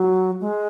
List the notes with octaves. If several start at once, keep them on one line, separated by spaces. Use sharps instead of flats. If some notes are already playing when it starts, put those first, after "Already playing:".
Already playing: F#3
G#3